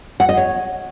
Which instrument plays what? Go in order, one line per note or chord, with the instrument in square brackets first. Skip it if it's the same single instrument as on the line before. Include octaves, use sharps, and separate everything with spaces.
[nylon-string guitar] F#5
D#5
C#5